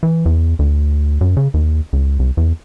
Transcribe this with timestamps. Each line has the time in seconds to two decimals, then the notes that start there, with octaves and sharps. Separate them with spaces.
0.03 E3
0.26 E2
0.59 D2
1.21 F#2
1.37 C#3
1.54 D#2
1.93 C#2
2.20 C2
2.37 E2